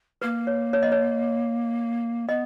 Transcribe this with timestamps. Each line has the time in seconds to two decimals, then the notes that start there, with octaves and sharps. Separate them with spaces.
0.22 A#3 B4
0.47 C#5
0.73 C#5
0.83 D#5
0.92 C#5
2.28 B3 D#5